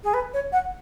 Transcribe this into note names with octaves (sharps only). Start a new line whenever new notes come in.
G#4
B4
C#5
F#5